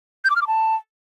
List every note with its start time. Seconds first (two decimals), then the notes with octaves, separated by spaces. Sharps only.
0.25 G6
0.30 D6
0.36 F6
0.42 D6
0.47 A5